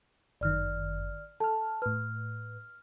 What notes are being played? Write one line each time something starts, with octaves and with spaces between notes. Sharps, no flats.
G1 F#2 D#3 D5 F6
A4 A5 F6
A2 B4 F6